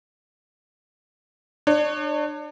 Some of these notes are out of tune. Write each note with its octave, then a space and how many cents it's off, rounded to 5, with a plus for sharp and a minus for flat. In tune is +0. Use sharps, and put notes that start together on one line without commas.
D4 +30 C#5 +0